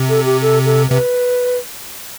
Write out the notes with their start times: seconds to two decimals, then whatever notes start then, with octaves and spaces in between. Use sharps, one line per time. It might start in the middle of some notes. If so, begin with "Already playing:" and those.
Already playing: C3
0.09 A4
0.26 G4
0.42 A4
0.66 A4
0.90 C3 B4